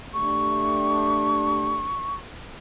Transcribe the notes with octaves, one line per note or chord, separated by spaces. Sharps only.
A3 D4 G4 C#6